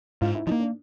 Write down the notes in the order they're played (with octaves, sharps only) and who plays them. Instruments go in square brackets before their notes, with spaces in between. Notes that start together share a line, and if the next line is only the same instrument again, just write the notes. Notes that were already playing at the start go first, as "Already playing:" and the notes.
[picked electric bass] G#2 [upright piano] F4
[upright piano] E4
[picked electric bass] F3 [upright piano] D#4
[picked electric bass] A#3
[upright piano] D4